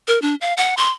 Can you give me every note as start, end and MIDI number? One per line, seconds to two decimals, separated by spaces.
0.08 0.21 70
0.22 0.35 62
0.41 0.54 77
0.57 0.75 78
0.77 0.90 84